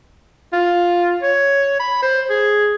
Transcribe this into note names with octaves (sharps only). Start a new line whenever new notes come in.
F4
C#5
B5
C5
G#4